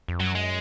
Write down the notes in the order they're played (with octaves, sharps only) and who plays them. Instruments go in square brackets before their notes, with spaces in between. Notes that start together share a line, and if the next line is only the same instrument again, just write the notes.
[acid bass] F2
[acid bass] F#2 [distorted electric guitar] F#3
[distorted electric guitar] G#3